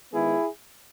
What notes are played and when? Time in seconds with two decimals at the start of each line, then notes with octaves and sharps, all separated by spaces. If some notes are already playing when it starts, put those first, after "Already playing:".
0.13 D#3 G#3 B3 E4 G#4